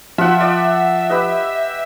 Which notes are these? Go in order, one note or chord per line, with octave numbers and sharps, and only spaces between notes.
F3 F4 E5 F#5
D5 D#5 F#5
G4 B4 D#5